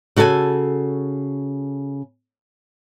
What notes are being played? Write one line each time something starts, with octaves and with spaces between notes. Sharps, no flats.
C#3 F#4 A4 D5 G#5